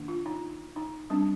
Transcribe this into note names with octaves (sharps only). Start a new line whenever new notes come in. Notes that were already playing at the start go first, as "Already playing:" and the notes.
Already playing: D#3 A#3 D4
F4
D#4
D#4
G3 C4 D4